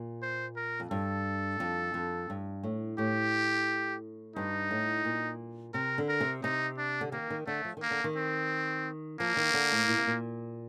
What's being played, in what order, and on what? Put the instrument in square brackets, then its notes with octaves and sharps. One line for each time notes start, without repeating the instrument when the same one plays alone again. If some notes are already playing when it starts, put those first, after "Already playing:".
Already playing: [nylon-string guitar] A#2
[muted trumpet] C5
A#4
[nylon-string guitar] F2
[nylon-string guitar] G2 [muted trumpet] A4
[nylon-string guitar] F2
F2
G2
A2
[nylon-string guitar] A2 [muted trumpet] G4
[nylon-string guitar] G2 [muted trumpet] D#4
[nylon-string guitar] A2
A#2
[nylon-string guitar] C3 [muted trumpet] A#4
[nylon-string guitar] D3
[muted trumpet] A#4
[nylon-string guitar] C3
[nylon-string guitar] C3 [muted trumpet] D#4
[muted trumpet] D4
[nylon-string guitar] D3
[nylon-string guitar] D#3 [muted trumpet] A#3
[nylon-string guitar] D#3
[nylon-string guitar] D3 [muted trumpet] A3
[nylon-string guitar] F3
D#3
[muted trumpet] A#3
[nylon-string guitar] D3
D#3
[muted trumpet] C4
[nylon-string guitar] F3 [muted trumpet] A#3
[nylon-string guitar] D#3
D3
A2
A#2
C3
A#2